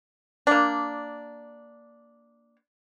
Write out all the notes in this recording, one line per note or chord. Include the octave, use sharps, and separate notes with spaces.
A#3 D4